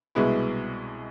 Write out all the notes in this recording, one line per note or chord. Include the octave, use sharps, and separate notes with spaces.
C2 B2 G#3 B3 E4